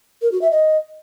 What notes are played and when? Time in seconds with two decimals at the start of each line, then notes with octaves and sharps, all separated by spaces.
0.22 A#4
0.32 F#4
0.41 E5
0.51 D#5